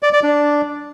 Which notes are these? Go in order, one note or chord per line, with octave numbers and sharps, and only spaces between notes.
D5
D5
D4